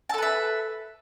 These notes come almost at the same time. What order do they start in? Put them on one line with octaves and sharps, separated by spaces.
A5 A4 B4 E5